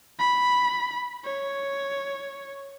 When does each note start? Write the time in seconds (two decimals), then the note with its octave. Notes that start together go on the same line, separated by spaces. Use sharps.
0.19 B5
1.25 C#5